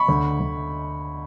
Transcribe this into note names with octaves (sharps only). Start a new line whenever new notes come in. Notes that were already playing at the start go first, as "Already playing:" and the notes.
Already playing: B5 C#6
D2
D2